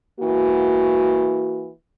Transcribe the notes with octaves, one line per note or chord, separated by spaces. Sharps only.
E3 A#3 F#4